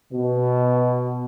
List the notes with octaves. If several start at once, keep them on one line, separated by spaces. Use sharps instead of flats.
B2